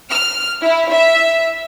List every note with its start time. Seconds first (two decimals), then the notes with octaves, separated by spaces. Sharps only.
0.11 F6
0.63 E4
0.92 E5